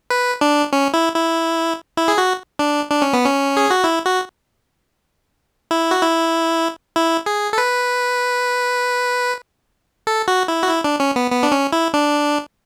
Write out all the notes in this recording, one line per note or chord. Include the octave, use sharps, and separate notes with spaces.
B4
D4
C#4
E4
E4
E4
G#4
F#4
D4
D4
C#4
B3
C#4
G#4
F#4
E4
F#4
E4
F#4
E4
E4
G#4
A4
B4
A4
F#4
E4
F#4
E4
D4
C#4
B3
B3
D4
C#4
E4
D4